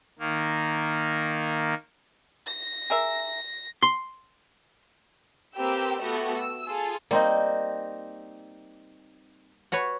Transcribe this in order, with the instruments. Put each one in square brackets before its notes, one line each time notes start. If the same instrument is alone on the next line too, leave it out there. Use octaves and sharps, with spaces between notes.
[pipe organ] D#3 A#3
[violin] A#6
[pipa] G#4 A#4 E5
[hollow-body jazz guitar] C6
[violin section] A#3 C4 G4 B4 G5 E6
A3 B3 F#4 G4 A4
E6
F4 G#4 A4
[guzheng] G3 [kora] A#3 C4 D#4
[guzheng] F#4 B4 C#5